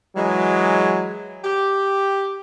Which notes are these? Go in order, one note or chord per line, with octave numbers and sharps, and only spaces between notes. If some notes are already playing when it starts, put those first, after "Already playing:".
E3 F#3 G#3
G4